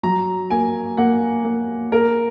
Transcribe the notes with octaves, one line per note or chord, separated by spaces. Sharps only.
F#3 A#5
A#3 G#5
A#3 F#5
A#3
A#3 A#4